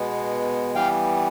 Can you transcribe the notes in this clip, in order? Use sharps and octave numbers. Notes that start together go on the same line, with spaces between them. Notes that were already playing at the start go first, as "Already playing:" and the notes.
Already playing: B2 G#3 B3
E3 G3 B3 F5 G5